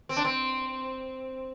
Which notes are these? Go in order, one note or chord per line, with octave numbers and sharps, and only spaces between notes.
C4
D4
C4